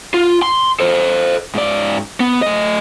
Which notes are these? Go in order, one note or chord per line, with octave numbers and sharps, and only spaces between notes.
F4
C6
A4 C5
G#2 D5
B3
A3 D#5